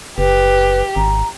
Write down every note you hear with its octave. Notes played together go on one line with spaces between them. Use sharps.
F#1 G4 B4
G#1 A#5